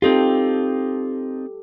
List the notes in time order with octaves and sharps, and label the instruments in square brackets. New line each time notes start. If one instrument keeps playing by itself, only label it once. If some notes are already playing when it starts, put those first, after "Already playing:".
[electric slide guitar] C4 D#4 F4 [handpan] G4 A4